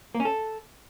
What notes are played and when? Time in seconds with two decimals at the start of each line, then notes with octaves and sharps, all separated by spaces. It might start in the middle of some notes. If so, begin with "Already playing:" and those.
0.15 A#3
0.20 C#4
0.25 A4